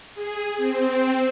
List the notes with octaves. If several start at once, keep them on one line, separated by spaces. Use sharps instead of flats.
G#4
C4